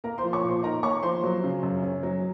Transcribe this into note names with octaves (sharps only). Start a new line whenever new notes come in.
A#3 A#4 A#5
C5 C6
F3
C#5 C#6
A#2
C5 C6
D#4 A#4 A#5
A#3 C#5 C#6
F3 C5 C6
F#3
C#3
F#2
C#4
F#3